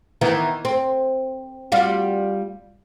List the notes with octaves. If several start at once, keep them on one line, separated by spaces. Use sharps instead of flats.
D#3 E3 B3
C4
G3 F4 F#4